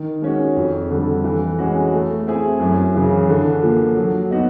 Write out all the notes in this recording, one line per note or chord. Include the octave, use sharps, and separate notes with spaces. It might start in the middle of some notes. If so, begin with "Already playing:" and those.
Already playing: D#3
G#3 C#4 F#4
F2
D3 G3
E3
G#3 C#4 F#4
A3
C4 E4 G#4
F#2
C#3 E3
D3
F3 A#3
F#3
B3 D#4 F#4